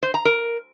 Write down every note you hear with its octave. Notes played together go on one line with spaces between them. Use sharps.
C5
A#5
A#4